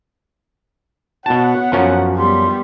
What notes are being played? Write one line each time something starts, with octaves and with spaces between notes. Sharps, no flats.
B2 B3 F#4 C#5 F#5 A5
F#2 F3 C#4 F#4
G3 B3 C6